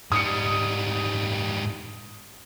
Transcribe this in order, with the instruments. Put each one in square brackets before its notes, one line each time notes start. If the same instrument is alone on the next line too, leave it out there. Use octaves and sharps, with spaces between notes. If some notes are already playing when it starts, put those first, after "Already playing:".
[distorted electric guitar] G#2 G3 [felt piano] D#6 C#7